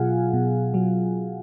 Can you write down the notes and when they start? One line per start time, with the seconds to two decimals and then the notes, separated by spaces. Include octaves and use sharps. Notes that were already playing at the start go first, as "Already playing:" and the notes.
Already playing: B2 F#3 F4 G#4 F5 F#5 G#5
0.34 B2
0.74 F#3